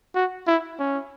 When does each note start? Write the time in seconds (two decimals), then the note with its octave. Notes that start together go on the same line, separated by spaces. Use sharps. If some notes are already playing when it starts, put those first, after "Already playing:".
0.15 F#4
0.47 E4
0.79 C#4